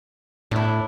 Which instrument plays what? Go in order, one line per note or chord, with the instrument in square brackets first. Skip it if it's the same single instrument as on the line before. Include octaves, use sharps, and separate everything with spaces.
[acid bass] A2 [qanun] D4 E4